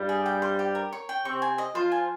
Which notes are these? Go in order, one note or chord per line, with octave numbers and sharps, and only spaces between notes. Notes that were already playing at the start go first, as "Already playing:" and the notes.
Already playing: G2 G3
G#4
G5
C5
G4
A#4
C#5
G5
C3 C4 C#6
G#5
D#5
F3 F4 C5
G#5